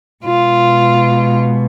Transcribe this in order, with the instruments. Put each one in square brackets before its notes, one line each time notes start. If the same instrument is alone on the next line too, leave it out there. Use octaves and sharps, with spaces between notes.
[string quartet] B2 G#3 F4